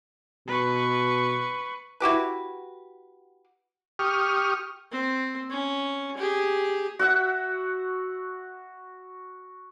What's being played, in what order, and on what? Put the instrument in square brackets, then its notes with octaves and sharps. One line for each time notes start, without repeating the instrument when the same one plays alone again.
[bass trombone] B2 [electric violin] B4 C#6
[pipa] E4 F#4 G4 B4
[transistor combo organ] G4 C#6 D#6 F6
[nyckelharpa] C4
C#4
G4 G#4
[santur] F#4 E5 F#5